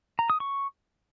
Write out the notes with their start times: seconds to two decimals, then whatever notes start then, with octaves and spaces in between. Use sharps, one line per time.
0.19 A#5
0.30 D#6
0.40 C#6